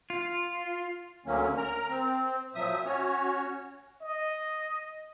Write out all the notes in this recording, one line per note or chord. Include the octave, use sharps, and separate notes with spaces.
F4
D2 D3 F#3 A#3 C#4
A#4 A#5
C4
A#2 F3 F#3 E5 D#6
C#4 F#4 C#5
D#5